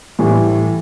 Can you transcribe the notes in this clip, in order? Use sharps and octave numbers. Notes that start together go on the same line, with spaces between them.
A2 E3 G3